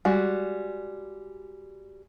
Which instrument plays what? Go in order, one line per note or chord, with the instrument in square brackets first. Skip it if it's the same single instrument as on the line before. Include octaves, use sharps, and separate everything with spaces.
[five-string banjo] G3 G#3 F#4